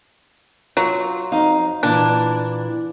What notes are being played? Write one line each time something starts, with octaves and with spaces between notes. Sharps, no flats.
F#3 F4
F2 D#4 F5
A#2 E3 D4